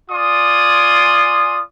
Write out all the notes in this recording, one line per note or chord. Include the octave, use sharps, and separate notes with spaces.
F4 D5 G#5 C6 D#6